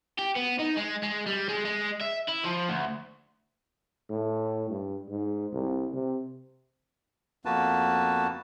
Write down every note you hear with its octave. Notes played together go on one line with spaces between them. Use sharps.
G4
B3
D#4
G#3
G#3
G3
G#3
G#3
E5
E4
F3
D2
A2
G2
G#2
C2
C3
F2 A#3 B3 F#4 B4 A5